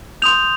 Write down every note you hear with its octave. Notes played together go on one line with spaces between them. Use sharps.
C6 D#6 G6 F7